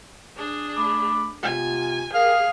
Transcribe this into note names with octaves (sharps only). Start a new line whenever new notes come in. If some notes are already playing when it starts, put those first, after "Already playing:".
D4 G#4
A3 B5 D6
C3 B3 F4 G#5
G4 G#4 A#4 F5